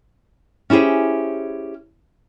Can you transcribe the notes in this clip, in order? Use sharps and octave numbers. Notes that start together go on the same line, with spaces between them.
C#4 E4 G4 G#4 C5